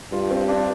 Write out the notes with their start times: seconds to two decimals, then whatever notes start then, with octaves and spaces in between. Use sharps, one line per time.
0.12 G2 F4
0.31 C4
0.49 D4